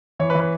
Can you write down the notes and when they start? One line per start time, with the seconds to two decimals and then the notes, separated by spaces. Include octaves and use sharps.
0.19 E3 C#5
0.30 B4
0.35 E3
0.40 B4